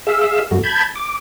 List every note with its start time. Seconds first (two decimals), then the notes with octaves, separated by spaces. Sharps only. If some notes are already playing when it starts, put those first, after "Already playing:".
0.07 G#4 E5 F5 E6
0.51 F#2 A3 F#4
0.63 A5 B5 G6 G#6
0.96 D6